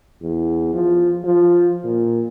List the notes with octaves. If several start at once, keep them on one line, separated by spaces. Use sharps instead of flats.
E2
F3
F3
A#2